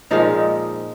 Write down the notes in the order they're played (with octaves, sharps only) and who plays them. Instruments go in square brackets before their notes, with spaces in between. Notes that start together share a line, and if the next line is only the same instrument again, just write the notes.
[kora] A#2 F3 G#3 D#4